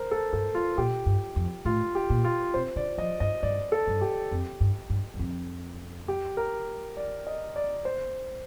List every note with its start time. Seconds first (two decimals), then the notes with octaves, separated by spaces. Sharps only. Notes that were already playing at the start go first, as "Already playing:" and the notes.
Already playing: A#4 C5
0.11 A4
0.33 G2 A4
0.55 F4
0.78 A#2 G4
1.06 G2
1.36 F2
1.65 A2 F4
1.95 G4
2.10 A#2
2.24 F4
2.54 C3 C5
2.76 D3 D5
2.98 F3 D#5
3.20 G2 D#5
3.43 G2 D5
3.72 A4
3.87 G2
4.01 G4
4.31 F2
4.60 G2
4.90 G2
5.14 G2
5.19 F2
6.08 G4
6.37 A#4
6.97 D5
7.27 D#5
7.56 D5
7.85 C5